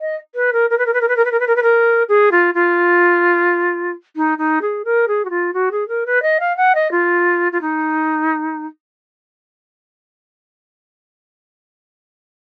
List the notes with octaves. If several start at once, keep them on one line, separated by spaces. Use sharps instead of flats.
D#5
B4
A#4
A#4
B4
A#4
B4
A#4
B4
A#4
B4
A#4
B4
A#4
B4
A#4
G#4
F4
F4
D#4
D#4
G#4
A#4
G#4
F#4
F4
F#4
G#4
A#4
B4
D#5
F5
F#5
D#5
F4
F4
D#4